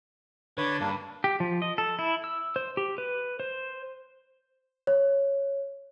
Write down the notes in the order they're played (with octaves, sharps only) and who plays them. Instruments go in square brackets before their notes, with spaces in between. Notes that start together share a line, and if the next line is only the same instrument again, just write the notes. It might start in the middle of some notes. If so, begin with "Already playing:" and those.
[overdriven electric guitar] D3 [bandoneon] B4 C#5
[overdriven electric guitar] G2 [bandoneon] A#3 D4
[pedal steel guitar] G4
F3
D#5
A4
E4
E6
C5
G4
B4
C5
[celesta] C#5